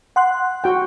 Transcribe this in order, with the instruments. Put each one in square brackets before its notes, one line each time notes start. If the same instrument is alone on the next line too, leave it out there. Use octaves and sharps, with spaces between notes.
[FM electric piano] F#5 C6 F#6
[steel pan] F#4 G5